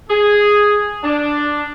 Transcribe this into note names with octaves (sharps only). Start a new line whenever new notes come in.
G#4
D4